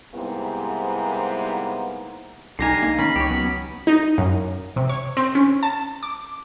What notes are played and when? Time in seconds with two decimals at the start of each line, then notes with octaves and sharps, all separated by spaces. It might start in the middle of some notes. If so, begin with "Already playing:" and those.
0.15 G#2 C3 G3 A#3 B3 E4
2.59 C2 D3 D#4 G4 G#5 A#6 C7
2.82 A#3
2.99 D#3 C#4 B5
3.16 C#2 G4 C#5
3.29 F#3 B3 C#4
3.87 D#4
4.18 F#2
4.76 C3
4.89 C#5
5.17 C4
5.35 C#4
5.63 A5
6.03 D6